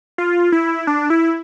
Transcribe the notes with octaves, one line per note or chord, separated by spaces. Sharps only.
F4
E4
D4
E4